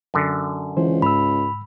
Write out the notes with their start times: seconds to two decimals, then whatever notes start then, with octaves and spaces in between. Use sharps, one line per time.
0.14 F#2 D3
0.77 C#2 E3 E4 C5
1.02 G#2 B5 E6